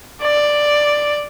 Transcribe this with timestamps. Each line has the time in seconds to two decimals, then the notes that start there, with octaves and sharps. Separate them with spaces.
0.23 D5